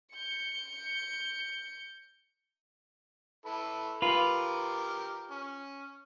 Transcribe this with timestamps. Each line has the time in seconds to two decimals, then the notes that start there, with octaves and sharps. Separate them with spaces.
0.13 G6 C#7
3.45 E4 A4 B4
4.02 F4 G4 A#4 B4
5.31 C#4